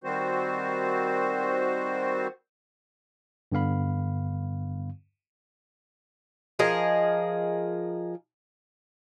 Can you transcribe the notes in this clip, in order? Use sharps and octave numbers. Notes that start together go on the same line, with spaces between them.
D#3 G3 C4 F#4 C5
G2 D3 B3 F5 B5
F3 G#4 A#4 D#5